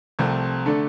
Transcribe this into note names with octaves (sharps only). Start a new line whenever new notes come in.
C2 C3 F3 A3 C4
D3 A3 D4 A4